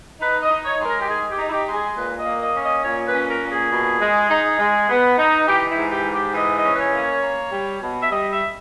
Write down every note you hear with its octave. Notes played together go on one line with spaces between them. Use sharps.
D#4 B4
D#5
D#4
C#5
G#3
A#4
G4
D#4 G#4
G4
D#4
E4
G4
G#3
G#4
A#2 B4
D#5
A#3
D#5
C#4
D#5
A#2 C#5
B4
C#4
A#4
A#2
G#4
B2
G#3
D#4
G#3
B3
D#4
E3 G4
E4
G#2
G4
G#2
G4
E3 D#5
D#5
C#4
B4
C#5
A#3
C#5
A#3
G3
B2
E5
G3 D#5
E5